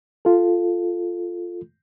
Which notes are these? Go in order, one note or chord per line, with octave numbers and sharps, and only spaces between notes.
F4 A4